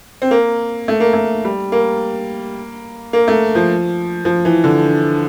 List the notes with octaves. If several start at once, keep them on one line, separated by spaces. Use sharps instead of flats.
C4
A#3
A3
A#3
A3
G3
A#3
A#3
A3
F3
F3
E3
D3